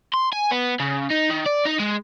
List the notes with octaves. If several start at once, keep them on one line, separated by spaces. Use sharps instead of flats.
C6
G#5
B3
C#3
D#4
D#3
D5
D#4
G#3